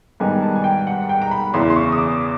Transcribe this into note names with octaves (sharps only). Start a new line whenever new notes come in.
G#2 D#3 G3 B3 D#4 G#5
A5
G#5
G5
F#5
G5
A#5
B5
E2 C#3 E3 C6
C6
C#6
D#6
D6